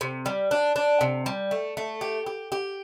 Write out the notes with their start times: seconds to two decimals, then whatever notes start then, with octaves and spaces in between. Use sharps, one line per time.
0.01 C3
0.26 G3
0.51 D4
0.76 D4
1.01 C3
1.26 G3
1.51 A3
1.77 A3
2.01 G4
2.26 G4
2.52 G4